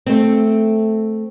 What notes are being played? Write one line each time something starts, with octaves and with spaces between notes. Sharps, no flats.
A3 C4